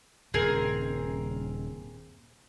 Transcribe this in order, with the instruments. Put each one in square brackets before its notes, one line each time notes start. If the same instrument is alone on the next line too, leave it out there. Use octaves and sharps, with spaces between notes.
[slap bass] D#1 G2 C#3 [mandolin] C4 G#4 A#4